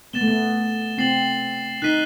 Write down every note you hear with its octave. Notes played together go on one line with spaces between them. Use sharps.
B3 A6 E7 G7
A3
B3
C4 A6 C7 F#7
D#4 F#6 B6 D#7 G7